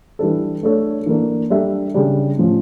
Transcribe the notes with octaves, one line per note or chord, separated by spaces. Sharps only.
E3 G3 D4 A4
A3 D4 A4 C#5
E3 A#3 D4
G3 D4 A4 E5
C#3 G3 D4
A2 F3 C#4 F4